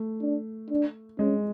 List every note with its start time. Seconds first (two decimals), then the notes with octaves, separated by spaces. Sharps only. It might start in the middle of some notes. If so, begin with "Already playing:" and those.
Already playing: A3
0.21 D4
0.70 D4
1.19 G#3 C#4